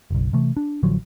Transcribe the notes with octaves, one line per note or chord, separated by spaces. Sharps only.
F#1 B1
C3 E3 A3
D4
A1 D3 F3 F#3